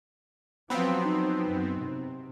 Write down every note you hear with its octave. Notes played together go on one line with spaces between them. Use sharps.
F3 F#3 B3 C4 F5 B5
D#4
F#2
C3